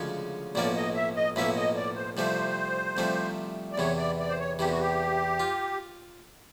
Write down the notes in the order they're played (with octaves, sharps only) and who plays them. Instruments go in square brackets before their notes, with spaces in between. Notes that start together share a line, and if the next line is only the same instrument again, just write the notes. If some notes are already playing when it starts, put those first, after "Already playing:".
Already playing: [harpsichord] D2 C#3 F3 G#3 C#4
[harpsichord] B1 A2 F3 A#3 C#4 [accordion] D5
[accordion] D#5
E5
D#5
[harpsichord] B1 A2 F3 A#3 C#4 [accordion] E5
[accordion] D#5
D5
C5
[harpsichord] C2 C3 F3 A3 [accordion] C5
[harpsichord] C2 C3 F3 A3
[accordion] D5
[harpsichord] E2 C3 E3 [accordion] C#5
[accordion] D5
D5
C5
C#5
[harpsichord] E2 C3 E3 [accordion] G4
[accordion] F#4
G4
[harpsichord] F4